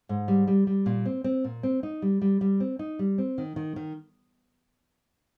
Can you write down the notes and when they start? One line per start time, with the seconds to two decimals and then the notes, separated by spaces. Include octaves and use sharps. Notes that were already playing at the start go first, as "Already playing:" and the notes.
0.09 G#2
0.28 G3
0.47 G3
0.67 G3
0.86 A#2
1.05 C4
1.24 C4
1.44 A#2
1.63 C4
1.83 D#4
2.02 G3
2.22 G3
2.41 G3
2.60 C4
2.79 D#4
2.99 G3
3.18 C4
3.38 D#3
3.56 D#3
3.76 D#3